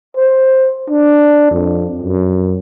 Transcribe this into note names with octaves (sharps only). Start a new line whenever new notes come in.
C5
D4
F2
F#2